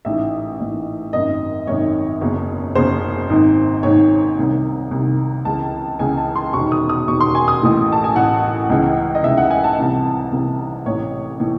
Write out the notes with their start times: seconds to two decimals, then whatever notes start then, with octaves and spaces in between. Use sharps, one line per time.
0.05 A1 G#2 E3 E5
0.60 A1 G#2 E3
1.13 G#1 F#2 D#3 D#5
1.67 G#1 F#2 D#3 C#5
2.21 F#1 E2 C#3
2.75 F#1 E2 C#3 C5
3.29 G#1 G#2 D#3
3.83 G#1 G#2 D#3 C#5
4.38 C2 C3 D#3
4.91 C2 C3 D#3
5.45 C#2 C#3 E3 A5
5.99 C#2 C#3 E3 G#5
6.18 A5
6.36 C6
6.53 E1 E2 D#3 C#6
6.72 D#6
6.89 D#6
7.08 E1 E2 D#3 C#6
7.21 C6
7.35 G#5
7.48 D#6
7.62 A1 A2 E3
7.92 A5
8.04 G#5
8.15 A1 A2 E3 F#5
8.69 C#2 C#3 E3
9.15 D#5
9.24 C#2 C#3 E3 E5
9.38 F#5
9.50 G#5
9.64 A5
9.78 C2 C3 E3
10.31 C2 C3 E3
10.86 A1 A2 E3 C#5
11.40 A2 E3